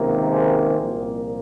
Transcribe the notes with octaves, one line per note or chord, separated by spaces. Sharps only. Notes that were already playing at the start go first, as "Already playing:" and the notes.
Already playing: C#2 C3 D#3 A#3
G#4 C5
C2 A#2 F3 A#3